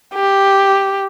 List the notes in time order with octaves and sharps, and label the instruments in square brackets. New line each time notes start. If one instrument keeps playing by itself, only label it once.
[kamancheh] G4